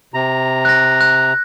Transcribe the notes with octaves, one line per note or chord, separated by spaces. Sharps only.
C3 A#5
F#6 A#6
F#6